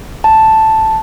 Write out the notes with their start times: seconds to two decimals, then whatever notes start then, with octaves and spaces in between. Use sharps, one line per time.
0.24 A5